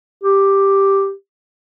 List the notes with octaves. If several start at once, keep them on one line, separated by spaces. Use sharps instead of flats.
G4